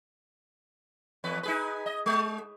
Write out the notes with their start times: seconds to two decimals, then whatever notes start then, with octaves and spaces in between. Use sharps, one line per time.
1.24 E2 B4
1.43 D#4 G#4 B4
1.86 D#5
2.06 G#3